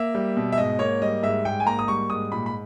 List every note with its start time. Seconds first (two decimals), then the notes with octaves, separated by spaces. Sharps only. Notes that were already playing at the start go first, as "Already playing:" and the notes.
Already playing: A#3 E5
0.15 G3
0.37 B2
0.52 E5
0.58 G#2 D#5
0.79 A#3 C#5
1.02 G3 D#5
1.23 G#2 E5
1.45 G#2 G5
1.60 G#5
1.66 A#3 A#5
1.79 D#6
1.88 G3 C#6
2.09 G#2 D#6
2.32 A#2 B5
2.46 B5